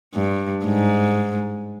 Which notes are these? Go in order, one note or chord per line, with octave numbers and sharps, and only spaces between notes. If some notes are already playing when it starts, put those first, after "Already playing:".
G2
G#2